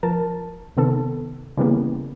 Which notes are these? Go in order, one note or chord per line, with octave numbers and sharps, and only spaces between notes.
F3 A#4 A5
C3 D#3 B3 A4
C#3 E3 G3 A#3 B3